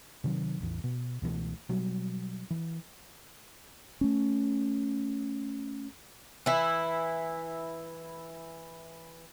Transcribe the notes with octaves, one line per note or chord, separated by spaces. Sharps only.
C3 D#3 F#3
A1 E2 E3
B2
C#2 B2 E3 A3
B2 F#3 G3
E3
A3 C#4
E3 E4